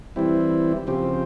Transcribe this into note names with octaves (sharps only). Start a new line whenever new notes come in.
E3 G3 C4 E4
C#3 F3 C4 G4